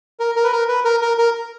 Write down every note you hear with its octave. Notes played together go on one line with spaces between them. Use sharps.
A#4
A#4
B4
A#4
B4
A#4
A#4
A#4